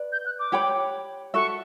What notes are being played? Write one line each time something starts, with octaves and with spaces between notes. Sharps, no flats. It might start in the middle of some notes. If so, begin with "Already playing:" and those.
Already playing: B4 D5
G6
F#6
D6
G4 C#5 G5 B5
F#4 A4 E5 C#6